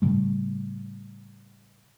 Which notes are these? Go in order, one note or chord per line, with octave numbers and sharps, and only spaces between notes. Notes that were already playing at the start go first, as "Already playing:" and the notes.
A2 C#3 G3 A3